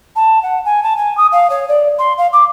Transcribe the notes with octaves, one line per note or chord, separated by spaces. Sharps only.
A5
F#5
G#5
A5
G#5
D#6
F5
C#5
D5
C6
F5
D6